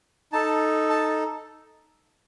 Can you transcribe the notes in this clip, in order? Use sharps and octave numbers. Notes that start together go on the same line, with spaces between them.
D#4 A4 A5
A5